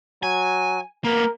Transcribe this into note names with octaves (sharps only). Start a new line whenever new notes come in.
F#3 G#5
A#3 B3 A#4